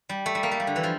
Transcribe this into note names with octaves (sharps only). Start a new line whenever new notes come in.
G3
A3
G3
A#3
A3
G3
D3
E3
F3